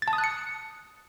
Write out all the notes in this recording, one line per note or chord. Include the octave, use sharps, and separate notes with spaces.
A6
A5
D#6
F#6
C#7